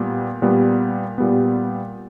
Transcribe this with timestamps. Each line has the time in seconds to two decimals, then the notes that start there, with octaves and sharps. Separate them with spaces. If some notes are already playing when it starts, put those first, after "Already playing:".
Already playing: A#2 G3 B3
0.42 A#2 G3 B3
1.18 A#2 G3 B3